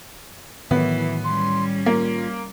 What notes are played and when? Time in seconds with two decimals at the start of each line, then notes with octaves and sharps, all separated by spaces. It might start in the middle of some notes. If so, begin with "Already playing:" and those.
0.71 A2 D#3 E3 F#3 B3
1.24 G3 C#4 C6
1.86 A#3 F4